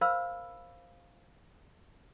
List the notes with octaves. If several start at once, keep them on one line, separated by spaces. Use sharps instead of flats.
A#4 C5 C#5 F5 B5 E6